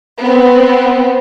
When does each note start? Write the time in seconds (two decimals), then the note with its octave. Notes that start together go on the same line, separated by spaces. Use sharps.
0.19 B3 C4